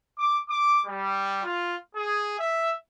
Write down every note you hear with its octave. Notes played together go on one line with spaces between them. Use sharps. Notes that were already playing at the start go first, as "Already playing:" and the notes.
D6
D6
G3
F4
G#4
E5